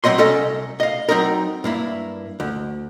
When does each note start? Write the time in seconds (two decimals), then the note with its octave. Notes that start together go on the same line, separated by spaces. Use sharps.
0.04 F#3 C4 C#5 D#5 C6
0.18 C2 C#4 A4 D#5
0.80 D#5 F5
1.09 F#3 C4 D#4 A#4
1.64 G2 A#3 E4
2.40 D2